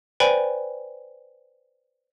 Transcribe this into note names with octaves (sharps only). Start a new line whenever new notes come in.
B4 C5 D5 G5 G#5 B5